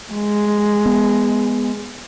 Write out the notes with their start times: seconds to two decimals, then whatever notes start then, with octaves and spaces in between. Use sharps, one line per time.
0.13 G#3
0.86 B3